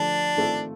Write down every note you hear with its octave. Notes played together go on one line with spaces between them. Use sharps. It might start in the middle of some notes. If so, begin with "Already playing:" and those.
Already playing: D3 F3 A3 D4 G4
D#3 A3 C4 F4 A4